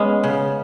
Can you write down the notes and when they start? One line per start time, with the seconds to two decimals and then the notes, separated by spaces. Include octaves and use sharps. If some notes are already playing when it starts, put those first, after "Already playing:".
Already playing: G#3 B3 C#4
0.24 C#3